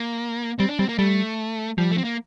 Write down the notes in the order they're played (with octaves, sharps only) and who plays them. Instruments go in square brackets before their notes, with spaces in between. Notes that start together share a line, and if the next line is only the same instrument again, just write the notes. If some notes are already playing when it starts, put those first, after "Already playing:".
Already playing: [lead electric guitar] A#3
[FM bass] G3 [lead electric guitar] C4
[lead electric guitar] D4
[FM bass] G3 [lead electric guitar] C4
[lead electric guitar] A#3
[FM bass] G3 [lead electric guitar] A3
[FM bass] F3 [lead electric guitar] G3
[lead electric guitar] A3
C4
A#3